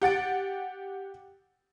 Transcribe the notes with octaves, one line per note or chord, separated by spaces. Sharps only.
G4 F#5 A6 D7